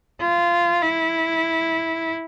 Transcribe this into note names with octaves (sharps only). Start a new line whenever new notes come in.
F4
E4